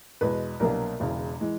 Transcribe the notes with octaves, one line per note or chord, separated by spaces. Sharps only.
E2 B2 G#3 B4
C2 B2 F#3 A#3 D4 A#4
E1 E2 C#3
E3 G#3